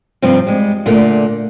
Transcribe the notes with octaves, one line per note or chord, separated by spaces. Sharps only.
G2 C3 F3 C4
G3 G#3
A#2 D3 A3